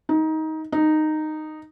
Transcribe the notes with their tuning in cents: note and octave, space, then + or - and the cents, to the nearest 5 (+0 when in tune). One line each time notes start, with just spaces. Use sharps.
D#4 +20
D#4 -10